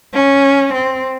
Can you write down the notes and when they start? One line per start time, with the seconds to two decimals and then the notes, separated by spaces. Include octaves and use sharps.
0.14 C#4
0.74 C4